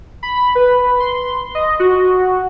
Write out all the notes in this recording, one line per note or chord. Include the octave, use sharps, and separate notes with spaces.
B5
B4
C6
D#5
F#4